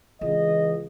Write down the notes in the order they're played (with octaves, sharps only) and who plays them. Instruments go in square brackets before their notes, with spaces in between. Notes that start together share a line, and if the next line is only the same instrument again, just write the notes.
[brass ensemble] C#2 [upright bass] E3 [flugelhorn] D#5